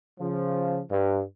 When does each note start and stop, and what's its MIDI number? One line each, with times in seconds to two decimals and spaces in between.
0.20 0.81 49
0.20 0.81 53
0.91 1.22 43